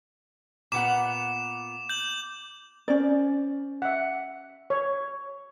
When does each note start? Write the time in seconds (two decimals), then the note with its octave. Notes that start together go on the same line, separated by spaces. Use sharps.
0.72 A#2 B3 F#5 D6 E7
1.89 G6 F#7
2.88 C#4 C5 D5
3.82 E5 F#5
4.70 C#5